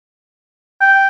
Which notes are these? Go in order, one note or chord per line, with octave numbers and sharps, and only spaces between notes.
G5